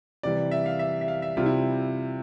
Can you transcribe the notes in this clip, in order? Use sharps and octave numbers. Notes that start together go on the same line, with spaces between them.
C3 E3 G3 D5
E5
F5
E5
E5
F5
E5
C3 G3 F4
E4